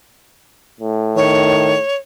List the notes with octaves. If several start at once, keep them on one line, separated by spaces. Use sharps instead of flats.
A2
D#3 C#5